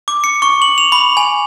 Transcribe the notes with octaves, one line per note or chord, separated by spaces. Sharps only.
D6
C#7
C#6
F#7
F7
B5
G#5